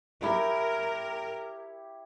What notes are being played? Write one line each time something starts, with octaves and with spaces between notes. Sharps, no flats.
E4 G4 A#4 C#5